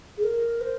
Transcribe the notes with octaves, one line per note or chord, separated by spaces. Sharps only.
G#4
A#4
C5